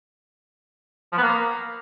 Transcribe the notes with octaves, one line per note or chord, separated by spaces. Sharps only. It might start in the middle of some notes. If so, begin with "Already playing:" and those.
F3
B3
A#3